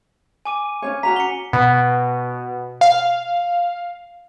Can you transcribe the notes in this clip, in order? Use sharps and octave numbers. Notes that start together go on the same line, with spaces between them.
G#5 D6 D#7
C#4 D4 C#5
C#4 F#4 A#5 B6 F7
C#7 G7
B2
F5